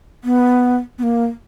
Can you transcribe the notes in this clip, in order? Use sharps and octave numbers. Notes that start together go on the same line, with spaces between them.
B3
B3
A#3